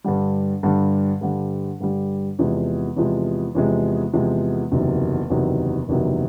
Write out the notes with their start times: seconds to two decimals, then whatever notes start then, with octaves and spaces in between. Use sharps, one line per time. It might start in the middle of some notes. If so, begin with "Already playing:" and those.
0.04 G2 D3 G3
0.63 G2 D3 G3
1.21 G2 D3 G3
1.80 G2 D3 G3
2.39 E2 C3 F3 G#3
2.96 E2 C3 F3 G#3
3.55 E2 C3 F3 G#3
4.13 E2 C3 F3 G#3
4.71 F#1 E2 C3 D#3 F#3
5.30 F#1 E2 C3 D#3 F#3
5.88 F#1 E2 C3 D#3 F#3